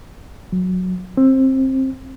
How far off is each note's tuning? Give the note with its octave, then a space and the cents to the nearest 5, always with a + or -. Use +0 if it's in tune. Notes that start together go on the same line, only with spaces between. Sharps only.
F#3 -10
C4 +20